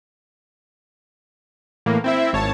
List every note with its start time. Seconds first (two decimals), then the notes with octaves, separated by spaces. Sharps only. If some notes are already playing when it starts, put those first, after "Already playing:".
1.86 A2 E3 A#3
2.04 C4 E4 E5
2.33 G#1 C#5 A5